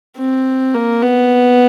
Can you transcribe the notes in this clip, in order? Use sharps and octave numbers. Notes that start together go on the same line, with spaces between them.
C4
A#3
B3